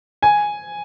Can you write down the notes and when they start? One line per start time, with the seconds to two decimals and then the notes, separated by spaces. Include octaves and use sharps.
0.23 G#5